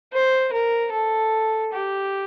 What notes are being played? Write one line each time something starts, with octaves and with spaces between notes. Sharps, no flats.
C5
A#4
A4
G4